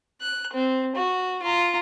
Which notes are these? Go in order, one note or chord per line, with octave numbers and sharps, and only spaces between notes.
F#6
C4
F#4
F4 A#5